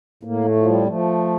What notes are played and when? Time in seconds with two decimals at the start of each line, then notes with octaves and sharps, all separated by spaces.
0.23 A2 A#3
0.44 A3
0.56 F3
0.66 G3
0.87 F3 A3